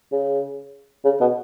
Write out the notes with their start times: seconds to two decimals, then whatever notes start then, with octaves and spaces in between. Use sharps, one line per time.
0.12 C#3
1.05 C#3
1.20 B2